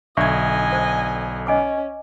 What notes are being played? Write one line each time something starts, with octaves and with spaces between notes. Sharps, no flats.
B1 D3 D4 D#5 E5 G#5 C#6 G#6
C5
C#4 D#5 G#5 D6